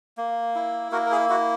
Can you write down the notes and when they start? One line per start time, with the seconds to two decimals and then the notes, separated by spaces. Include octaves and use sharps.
0.17 A#3
0.55 E4
0.92 A#3 F#4 A#4
1.06 A#4
1.11 G#4
1.29 E4 F#4